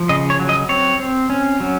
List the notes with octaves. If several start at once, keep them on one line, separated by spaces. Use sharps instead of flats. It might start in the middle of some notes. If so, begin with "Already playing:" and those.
Already playing: F3
C#3 D#5
C#5
F#3
D#5
C4 C#5
C4
C#4
F#3